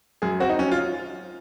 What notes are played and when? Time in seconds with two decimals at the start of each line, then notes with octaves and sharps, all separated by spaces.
0.22 F#2 G#4
0.40 C4 F#4
0.49 D#4
0.59 F#2 C#4
0.71 F4